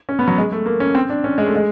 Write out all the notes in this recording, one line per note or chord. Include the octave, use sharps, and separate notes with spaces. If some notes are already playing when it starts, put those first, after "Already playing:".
C#4
B3
F#3
G#3
A3
A#3
C#4
C4
D4
C#4
G#3
A3
G#3